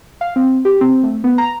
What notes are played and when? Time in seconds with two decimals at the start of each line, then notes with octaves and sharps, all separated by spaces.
0.21 F5
0.36 C4
0.65 G4
0.81 C4
1.03 A3
1.24 B3
1.38 A#5